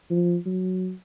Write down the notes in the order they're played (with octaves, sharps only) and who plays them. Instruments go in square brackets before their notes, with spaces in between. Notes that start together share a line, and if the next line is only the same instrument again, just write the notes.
[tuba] F3
F#3